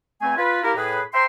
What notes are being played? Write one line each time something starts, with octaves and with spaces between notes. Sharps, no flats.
E2 A3 C4 G#5
F4 B4
A#3 E4 G4 A#4
A2 G#4 B4
C5 E5 G5 A#5 C6